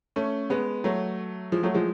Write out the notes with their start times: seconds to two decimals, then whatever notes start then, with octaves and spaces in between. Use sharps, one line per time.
0.16 A3 C#4
0.50 G#3 B3
0.84 F#3 A3
1.52 F3 G#3
1.63 F#3 A3
1.74 F3 G#3